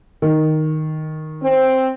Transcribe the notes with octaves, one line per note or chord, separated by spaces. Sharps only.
D#3
C4